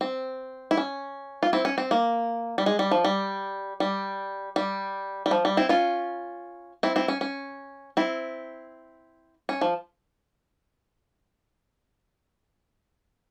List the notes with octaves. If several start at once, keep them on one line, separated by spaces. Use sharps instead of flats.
C4
E4
C#4
F4
C4 E4
C#4
C4
A#3
G3
G#3
G3
F3
G3
G3
G3
G3
F3
G3
C4 E4
C#4 F4
C4 E4
C4 E4
C#4
C#4
C4 E4
C#4
F3